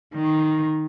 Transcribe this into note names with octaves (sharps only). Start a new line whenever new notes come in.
D#3